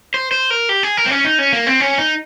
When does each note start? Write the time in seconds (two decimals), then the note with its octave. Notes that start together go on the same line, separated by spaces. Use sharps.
0.14 C5
0.32 C5
0.50 A#4
0.69 G4
0.83 G#4
0.97 A#4
1.06 C4
1.11 C#4
1.25 D#4
1.39 C#4
1.53 A#3
1.67 C4
1.80 C#4
1.98 D#4